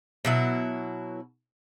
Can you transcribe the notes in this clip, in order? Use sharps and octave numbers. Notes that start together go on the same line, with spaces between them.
B2 F#3 E4